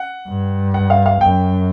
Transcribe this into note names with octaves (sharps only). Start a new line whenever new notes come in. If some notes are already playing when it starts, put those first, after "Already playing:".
Already playing: F#5
G2
F#5
F5
F5
F#2 G5